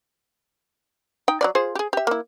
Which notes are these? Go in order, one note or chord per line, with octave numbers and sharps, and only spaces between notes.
D#4 G5
F#3 G3 D5
F4 G#4 C5
G4 G#4
G4 E5
A#3 E4